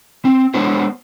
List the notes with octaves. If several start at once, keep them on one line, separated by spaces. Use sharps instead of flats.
C4
G#3 B3 D4 F#4 C5 C#5